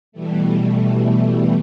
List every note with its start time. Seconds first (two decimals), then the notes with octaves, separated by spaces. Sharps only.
0.12 B2 E3 G3 A3